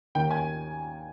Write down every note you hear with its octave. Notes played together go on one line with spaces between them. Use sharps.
D#2 D#3 A#3 G5
G#5